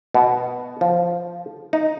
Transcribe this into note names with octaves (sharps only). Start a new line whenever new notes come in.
B2
F3
D#4